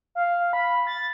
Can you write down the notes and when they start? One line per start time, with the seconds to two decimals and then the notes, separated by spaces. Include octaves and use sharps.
0.15 F5
0.53 B5
0.87 A6